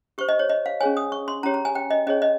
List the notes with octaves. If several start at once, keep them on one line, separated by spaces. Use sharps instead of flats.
G4 C5 C#6
D#5
C#5
D#5
F5
C#4 G#4 C#5 G#5
D#6
C#6
C6
C#4 G4 C#5 A#5
A#5
G#5
G5
D#5
C#4 G#4 C#5 D#5
D#5